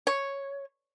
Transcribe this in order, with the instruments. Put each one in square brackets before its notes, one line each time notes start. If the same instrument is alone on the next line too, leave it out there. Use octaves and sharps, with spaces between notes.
[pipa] C#5